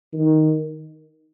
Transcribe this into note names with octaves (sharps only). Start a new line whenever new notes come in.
D#3